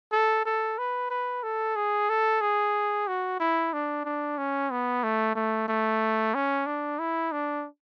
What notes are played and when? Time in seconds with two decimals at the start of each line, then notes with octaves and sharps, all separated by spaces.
0.12 A4
0.46 A4
0.78 B4
1.11 B4
1.43 A4
1.76 G#4
2.10 A4
2.41 G#4
3.08 F#4
3.40 E4
3.73 D4
4.05 D4
4.38 C#4
4.71 B3
5.04 A3
5.35 A3
5.68 A3
6.34 C#4
6.66 D4
6.99 E4
7.32 D4